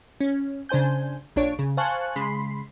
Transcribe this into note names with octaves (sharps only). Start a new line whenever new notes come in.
C#4
C#3 D4 C5 G#5 G6
A#1 A#2 D4 C#5 D7
C#3
C5 F5 G#5 A5 C#6 F#6
C#3 G#3 B5 C6 C7